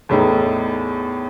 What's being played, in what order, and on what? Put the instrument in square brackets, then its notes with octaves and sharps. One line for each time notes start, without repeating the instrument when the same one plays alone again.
[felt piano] E2 A2 D#4